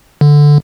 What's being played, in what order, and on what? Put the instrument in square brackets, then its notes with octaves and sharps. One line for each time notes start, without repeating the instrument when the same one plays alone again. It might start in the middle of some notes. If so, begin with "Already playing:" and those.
[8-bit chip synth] D3